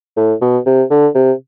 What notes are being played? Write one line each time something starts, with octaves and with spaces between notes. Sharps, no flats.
A2
B2
C3
D3
C3